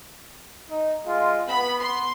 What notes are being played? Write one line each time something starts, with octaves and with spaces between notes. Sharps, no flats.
D#4
G#3 F4
B3 B5
C6